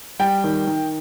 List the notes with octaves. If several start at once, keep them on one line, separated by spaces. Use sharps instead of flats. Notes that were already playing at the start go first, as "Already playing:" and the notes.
G3 G5
D#3
D#3